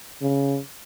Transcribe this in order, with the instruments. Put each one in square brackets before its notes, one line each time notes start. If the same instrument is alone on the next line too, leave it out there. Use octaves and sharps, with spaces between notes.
[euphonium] C#3